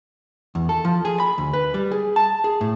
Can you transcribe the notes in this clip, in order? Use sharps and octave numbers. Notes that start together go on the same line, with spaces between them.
E2
A4
F3
G#4
B5
D2
B4
G3
G#4
A5
G#4
A2